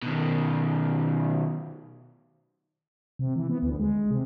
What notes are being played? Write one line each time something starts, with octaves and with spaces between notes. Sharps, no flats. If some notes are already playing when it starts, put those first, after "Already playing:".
B2 D#3
C3
E3
B3
D2
G#3
C3